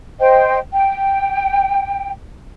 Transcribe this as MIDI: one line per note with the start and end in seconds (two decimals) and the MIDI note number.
0.19 0.58 72
0.19 0.58 75
0.19 0.58 79
0.73 2.11 79